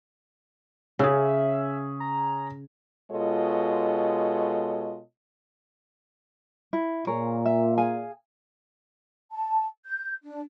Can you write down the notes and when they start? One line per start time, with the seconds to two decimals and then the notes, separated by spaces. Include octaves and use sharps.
0.99 C#3 C#4 G#4 E5
2.00 A#5
3.11 B2 G#3 F4 A4 C#5 D#5
6.73 E4
7.07 A#2 G#4 A#4 C#5
7.45 E5
7.78 G#4 F5 G#5
9.32 A5
9.86 G6
10.24 D4